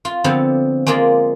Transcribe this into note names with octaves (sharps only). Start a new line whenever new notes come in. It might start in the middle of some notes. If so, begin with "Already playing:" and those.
F4 C6
D3 F3 B3 C4 F5
G#3 A#3 F4 G#4 D5